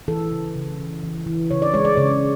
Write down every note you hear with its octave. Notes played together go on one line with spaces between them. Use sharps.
E3 A4
C#3
C#3
E3
E3
E3
C#3 C#5
D5
G#3 C#5
D5
C#3 C#5